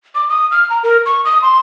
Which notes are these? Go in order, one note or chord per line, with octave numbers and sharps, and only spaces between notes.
D6
D#6
F6
A#5
A#4
C#6
D#6
C6